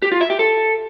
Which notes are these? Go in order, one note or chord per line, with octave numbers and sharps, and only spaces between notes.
G4
F4
E5
G4
A4